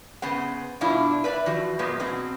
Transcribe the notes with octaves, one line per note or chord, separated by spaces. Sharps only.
C#3 B3 C5 F#5
G2 B2 D4 E4 F4
B4 D5 E5
E3 F3 F#4
A#2 F#3 G#3 B3
B2 C4 F#4